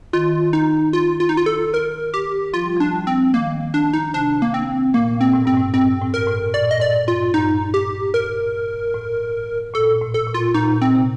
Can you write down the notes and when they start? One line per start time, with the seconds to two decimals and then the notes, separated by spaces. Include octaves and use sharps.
0.13 D#3 F4
0.53 D#4
0.93 F4
1.20 F4
1.29 D#4
1.37 F4
1.46 A4
1.74 A#4
2.14 G4
2.53 F3 F4
2.65 G3
2.77 F3 D4
2.94 G3
3.07 C4
3.34 D#3 A#3
3.74 D4
3.93 D#4
4.14 C3 D4
4.42 A#3
4.54 C4
4.94 A#2 A#3
5.21 C4
5.33 A2
5.45 G2 C4
5.57 A2
5.74 G2 C4
6.01 A2
6.14 G2 A#4
6.27 A2
6.54 A#2 D5
6.71 D#5
6.80 A2 D5
7.08 G2 F4
7.34 G2 D#4
7.74 G4
8.14 A#4
8.94 A2
9.74 A#2 A4
10.01 A2
10.14 A4
10.27 A#2
10.34 F4
10.54 A#2 D#4
10.81 C4
10.95 C3